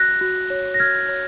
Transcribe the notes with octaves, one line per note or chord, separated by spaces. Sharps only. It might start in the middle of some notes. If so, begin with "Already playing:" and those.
Already playing: F#4 F#6 A#6
F#4
C#5
A#6
C#5 F6 G#6
C#5